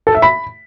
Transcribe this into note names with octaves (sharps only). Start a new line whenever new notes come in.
A4
E5
B5